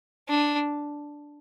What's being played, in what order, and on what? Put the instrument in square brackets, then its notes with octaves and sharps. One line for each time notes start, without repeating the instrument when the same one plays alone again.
[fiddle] D4